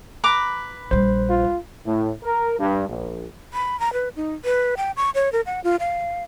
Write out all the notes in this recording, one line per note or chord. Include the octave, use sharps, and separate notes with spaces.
B4 A#5 D6
A#1 G3 C5
F4
A2
A#4
G2
A#1
B5
A#5
B4
D#4
B4
G5
C#6
C#5
A#4
F#5
F4
F5